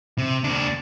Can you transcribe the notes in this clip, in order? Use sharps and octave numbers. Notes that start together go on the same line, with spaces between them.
C3
D#2 D4